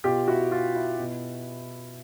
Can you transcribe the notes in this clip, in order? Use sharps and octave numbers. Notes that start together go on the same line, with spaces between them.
B2 F4 G4
E4 F#4
F4
E4
B2